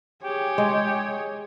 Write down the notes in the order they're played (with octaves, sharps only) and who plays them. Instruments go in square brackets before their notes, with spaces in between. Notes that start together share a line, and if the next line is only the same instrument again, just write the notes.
[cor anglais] G4 [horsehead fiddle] G#4 C#5
[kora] G#3